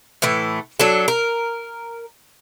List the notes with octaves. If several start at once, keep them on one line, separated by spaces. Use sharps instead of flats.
A2 E3 A3
F#3 D4 A4
A#4